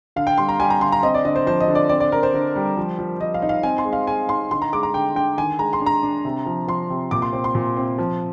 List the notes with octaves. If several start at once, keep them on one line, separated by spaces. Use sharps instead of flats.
D3 F5
G5
G3 C6
A#5
G3 G#5
A#5
D3 C6
A#5
C4 D#5
D5
D3 D#5
C5
F3 C5
D#5
D3
D5
C4 D5
D5
C4 A#4
C5
D3
G3
F3
F3
F3 D#5
F5
D#4
F5
C4 G#5
C6
G#3
F5
G#3 G#5
D#4 C6
D3 C6
A#5
G#3 D6
A#5
D3 G5
D3 G5
D#3 G#5
G#3 A#5
C6
D4
A#5
D4
C3
F3
F3 C6
C3
A#2 D6
C6
C4
C6
A#2
C4
F3